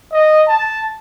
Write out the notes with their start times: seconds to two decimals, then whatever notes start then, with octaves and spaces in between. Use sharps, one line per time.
0.12 D#5
0.48 A5